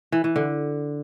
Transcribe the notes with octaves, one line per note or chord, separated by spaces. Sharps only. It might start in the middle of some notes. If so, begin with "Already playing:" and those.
E3
E3
D3